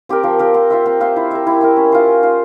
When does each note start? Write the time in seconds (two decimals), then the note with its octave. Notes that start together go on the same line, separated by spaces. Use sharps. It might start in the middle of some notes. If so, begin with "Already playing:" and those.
0.09 C4 G4 A#4
0.23 F3
0.39 C4 G4 A#4
0.54 C4
0.70 F4 C5 E5
0.86 C4
1.00 F4 C5 E5
1.16 E4
1.31 A#4 E5
1.47 E4
1.61 A#4 E5
1.77 C#4
1.92 F4 C5
2.07 C#4
2.23 F4 C5